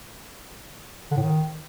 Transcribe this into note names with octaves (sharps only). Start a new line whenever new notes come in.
D3
A2
D#3